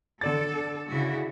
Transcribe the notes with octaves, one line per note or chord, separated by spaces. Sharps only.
D3 A4 D5 A6
C#3 E4 F#4